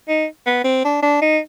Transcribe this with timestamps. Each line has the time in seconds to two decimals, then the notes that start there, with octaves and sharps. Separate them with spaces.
0.09 D#4
0.46 B3
0.64 C4
0.84 D4
1.02 D4
1.21 D#4